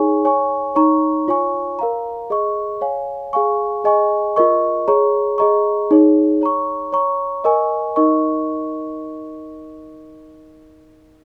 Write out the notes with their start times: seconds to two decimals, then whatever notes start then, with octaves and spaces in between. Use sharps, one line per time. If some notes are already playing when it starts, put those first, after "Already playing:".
Already playing: D#4 G#4 C#5 G#5 C#6
0.25 C#5 G#5 C#6
0.75 D#4 C#5 A#5 C#6
1.28 F4 C#5 G#5 C#6
1.79 A#4 F5 A#5
2.30 G#4 D#5 C#6
2.81 C#5 F5 G#5
3.33 G#4 F5 G#5 C#6
3.84 G#4 D#5 G#5 C#6
4.36 F4 A#4 D#5 C#6
4.88 G#4 C#5 A#5 C#6
5.38 G#4 D#5 A#5 C#6
5.91 D#4 G#4 C#5
6.41 C#5 A#5 C#6
6.93 C#5 A#5 C#6
7.44 A#4 D#5 G#5 C#6
7.96 D#4 A#4 D#5 C#6